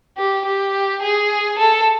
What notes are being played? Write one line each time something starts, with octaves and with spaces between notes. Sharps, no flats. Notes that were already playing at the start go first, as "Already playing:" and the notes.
G4
G4
G#4
A4